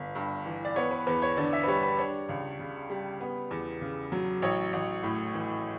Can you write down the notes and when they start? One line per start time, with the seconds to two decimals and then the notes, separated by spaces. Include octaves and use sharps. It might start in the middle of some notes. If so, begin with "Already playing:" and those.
Already playing: G1 B3 B4
0.15 G2
0.46 E3
0.65 D5
0.76 B3 C#5
0.91 B4
1.07 E2 B4
1.22 C#5
1.37 D3 D5
1.53 E5
1.63 B4
1.68 G3 C#5
1.83 B4
1.98 D4 C#5
2.29 C#2
2.59 C#3
2.90 G3
3.20 B3
3.51 E2
3.81 C#3
4.12 F#3
4.42 A1 C#5
4.73 A1
5.03 A2
5.34 E3